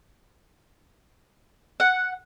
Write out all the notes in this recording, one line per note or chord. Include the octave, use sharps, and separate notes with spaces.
F#5